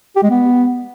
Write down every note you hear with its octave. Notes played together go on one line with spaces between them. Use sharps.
G4
G#3
B3